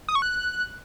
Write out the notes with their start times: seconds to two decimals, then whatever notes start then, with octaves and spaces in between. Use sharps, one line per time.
0.09 D#6
0.15 C#6
0.22 F#6